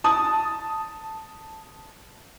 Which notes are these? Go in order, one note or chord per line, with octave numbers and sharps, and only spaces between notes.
A5 D#6